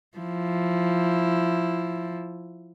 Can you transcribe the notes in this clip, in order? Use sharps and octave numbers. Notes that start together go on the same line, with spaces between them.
F3 E4